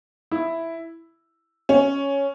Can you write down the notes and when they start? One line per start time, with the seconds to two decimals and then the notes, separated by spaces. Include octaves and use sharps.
0.32 E4
1.69 C#4